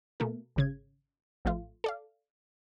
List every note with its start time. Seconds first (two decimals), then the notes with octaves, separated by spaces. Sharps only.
0.20 B2 A3 A#3 A#4
0.56 G#1 C#3 G#6
1.45 A1 F3 A3 F4
1.84 A4 D5 F5